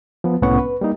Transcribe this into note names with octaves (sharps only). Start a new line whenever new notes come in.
F3 B3
C2 A2 B3 C#4 F#5 C#6
B4
G3 A#3 D#4